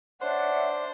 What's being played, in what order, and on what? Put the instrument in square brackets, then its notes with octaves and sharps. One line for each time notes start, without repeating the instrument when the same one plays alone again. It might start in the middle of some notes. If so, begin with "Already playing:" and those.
[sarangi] D4 [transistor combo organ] C5 [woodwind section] C#5 F#5 [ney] E5